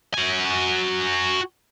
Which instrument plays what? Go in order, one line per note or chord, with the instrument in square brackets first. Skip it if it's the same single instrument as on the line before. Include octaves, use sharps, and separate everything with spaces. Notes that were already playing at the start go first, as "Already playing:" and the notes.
[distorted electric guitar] F#4 G#5